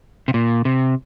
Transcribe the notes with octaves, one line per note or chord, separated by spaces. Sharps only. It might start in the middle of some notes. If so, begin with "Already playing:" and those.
C3
A#2
C3